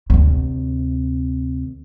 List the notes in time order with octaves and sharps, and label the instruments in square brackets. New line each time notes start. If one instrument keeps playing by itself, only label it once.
[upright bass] D2 C3